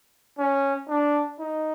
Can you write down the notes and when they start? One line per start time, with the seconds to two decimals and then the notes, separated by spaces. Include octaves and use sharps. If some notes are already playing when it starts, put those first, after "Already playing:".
0.38 C#4
0.89 D4
1.40 D#4